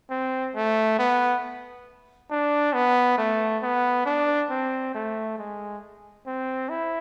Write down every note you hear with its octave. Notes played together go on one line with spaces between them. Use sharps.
C4
A3
B3
D4
B3
A3
B3
D4
C4
A3
G#3
C4
E4